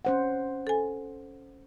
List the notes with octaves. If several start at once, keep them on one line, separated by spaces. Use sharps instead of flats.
C#4 C5 F#5
A4 G#5